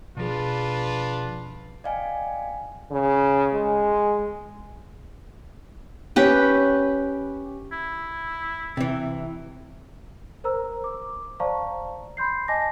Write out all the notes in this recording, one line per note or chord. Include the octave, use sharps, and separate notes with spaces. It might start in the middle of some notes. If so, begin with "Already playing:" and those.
B2 F3 D4 F4 G#4 B4
D5 D#5 F5 G5 G#5
C#3
G#3
C#4 G4 B4
E4
C3 E3
A#4 C5 A#5 E6
D6
C5 D5 F5 A5 A#5 C#6
B5 C6 G6 C7
D#5 G#5 A5 D6 A#6